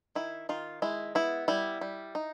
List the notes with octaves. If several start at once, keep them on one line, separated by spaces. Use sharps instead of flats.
D#3 E4
D#3 F4
G#3 E4
B3 E4
G3 E4
G3
D#4